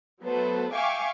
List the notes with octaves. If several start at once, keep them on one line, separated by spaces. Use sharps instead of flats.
F#3 A3 B3 A4 B4 C5
E5 F5 G5 G#5 C#6 D6